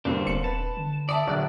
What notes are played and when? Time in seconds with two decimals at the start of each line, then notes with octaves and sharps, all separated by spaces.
0.05 G1 G2 D3 G3 A#3 C4 D4
0.27 D#1 C#7 F#7
0.44 B4 A5
0.77 D3
1.09 D5 E5 A5 D#6
1.27 A#1 D3 F#3 D5 F#6